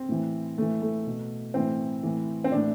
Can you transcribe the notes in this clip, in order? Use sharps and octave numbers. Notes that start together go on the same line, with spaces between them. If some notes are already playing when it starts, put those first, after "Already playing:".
Already playing: C4
A2 E3
A2 E3 A3
A3
B2
A2 E3 C4
A2 E3
C4
A2 E3 D4